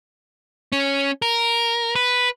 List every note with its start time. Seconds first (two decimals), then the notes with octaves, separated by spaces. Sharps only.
0.72 C#4
1.22 A#4
1.96 B4